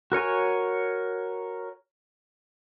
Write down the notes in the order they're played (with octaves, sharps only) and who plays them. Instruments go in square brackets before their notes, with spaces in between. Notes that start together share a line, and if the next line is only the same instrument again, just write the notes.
[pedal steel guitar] F#4 A#4 C#5 G#5